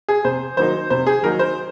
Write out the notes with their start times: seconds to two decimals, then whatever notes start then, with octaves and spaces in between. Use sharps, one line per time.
0.08 G#4
0.25 C3 C5
0.57 D#3 F#3 A#3 D#4 C5
0.90 C3 C5
1.07 G#4
1.23 D#3 F#3 A#3 D#4 A#4
1.39 C5